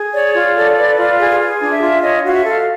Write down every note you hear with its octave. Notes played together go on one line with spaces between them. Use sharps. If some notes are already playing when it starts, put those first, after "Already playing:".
Already playing: G#4
C#5 D5
F4
A4
B4
F4
G#4
G#4
D4
E5
F4
C#5 D#5
F#4 F5
E5
A4
F5